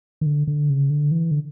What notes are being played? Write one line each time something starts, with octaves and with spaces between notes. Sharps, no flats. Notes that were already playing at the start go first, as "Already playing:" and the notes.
D#3
D3
D3
C#3
D3
E3
D3